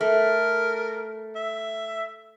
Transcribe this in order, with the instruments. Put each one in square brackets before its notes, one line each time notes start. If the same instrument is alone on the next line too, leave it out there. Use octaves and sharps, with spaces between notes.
[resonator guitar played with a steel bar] A3 [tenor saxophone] A#4
[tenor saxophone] E5